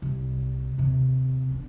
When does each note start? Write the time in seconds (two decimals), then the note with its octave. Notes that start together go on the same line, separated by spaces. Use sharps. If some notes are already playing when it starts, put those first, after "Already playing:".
0.02 C2
0.78 D#2 C3
1.51 B3 D4